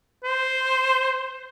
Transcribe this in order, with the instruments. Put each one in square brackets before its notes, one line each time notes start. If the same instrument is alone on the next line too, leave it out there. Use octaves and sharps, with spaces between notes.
[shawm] C5